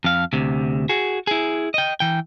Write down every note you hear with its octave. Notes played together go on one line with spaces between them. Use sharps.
F2 F5
D2 C3
F#4 G#4
E4 G#4
D#5 G5
E3 G5